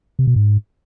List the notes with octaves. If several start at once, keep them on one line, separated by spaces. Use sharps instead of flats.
C3
B2
G#2